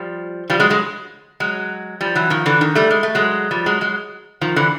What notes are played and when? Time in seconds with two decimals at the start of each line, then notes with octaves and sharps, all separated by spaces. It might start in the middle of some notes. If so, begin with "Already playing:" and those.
Already playing: F3 G3
0.50 F3 G3
0.60 F#3 G#3
0.70 F#3 G#3
1.40 F#3 G#3
2.01 F3 G3
2.16 E3 F#3
2.30 D#3 F3
2.46 D3 E3
2.61 D#3
2.75 G3 A3
2.90 G#3
3.03 A3
3.15 F#3 G#3
3.51 F3 G3
3.66 F#3 G#3
3.81 F#3 G#3
4.41 D#3 F3
4.56 D3 E3